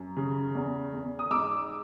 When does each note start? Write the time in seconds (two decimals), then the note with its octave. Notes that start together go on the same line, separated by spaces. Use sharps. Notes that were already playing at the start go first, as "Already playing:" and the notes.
Already playing: F#2
0.16 C#3
0.55 E2
0.93 E2
1.19 D#6
1.31 G#2 D6 E6